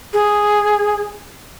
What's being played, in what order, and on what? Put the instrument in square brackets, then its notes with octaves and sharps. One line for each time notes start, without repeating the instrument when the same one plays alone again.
[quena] G#4